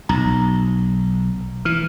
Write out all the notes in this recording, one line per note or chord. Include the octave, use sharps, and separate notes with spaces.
B1 A#5
E3 F6